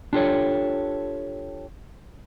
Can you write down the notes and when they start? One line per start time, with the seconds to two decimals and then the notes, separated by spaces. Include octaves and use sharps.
0.13 D4 F4 G4 A4 C#5